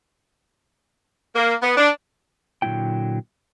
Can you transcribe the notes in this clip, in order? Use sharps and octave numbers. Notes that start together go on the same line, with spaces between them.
A#3
B3
D4
A#2 D3 F#3 A#3 E4 G5